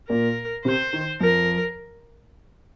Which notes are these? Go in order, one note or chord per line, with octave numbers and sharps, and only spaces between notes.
A#2 A#3 A#4
C3 C4 C5
D#3 D#4
F2 F3 A#4